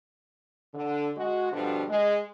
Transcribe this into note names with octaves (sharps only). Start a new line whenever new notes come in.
D3
G#3 F#4
B2 D3 F3 G3 D4 F#4
G#3